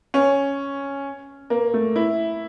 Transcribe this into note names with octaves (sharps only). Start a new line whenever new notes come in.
C#4
A#3
A3
E4